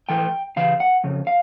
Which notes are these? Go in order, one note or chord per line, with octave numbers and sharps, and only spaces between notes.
A2 E3 A3 G5
C#3 E3 F5
F#5
F2 C#3
F5